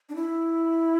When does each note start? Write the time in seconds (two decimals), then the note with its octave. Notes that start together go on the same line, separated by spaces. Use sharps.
0.09 D4
0.15 E4